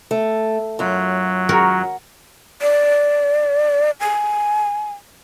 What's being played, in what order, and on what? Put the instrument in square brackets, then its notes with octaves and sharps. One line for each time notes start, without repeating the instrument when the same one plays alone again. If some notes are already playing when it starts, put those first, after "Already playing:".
[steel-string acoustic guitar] A3
[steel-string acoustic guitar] F#2 F4 [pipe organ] F#3
[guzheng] F#4 A#4 C#5
[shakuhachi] D5
G#5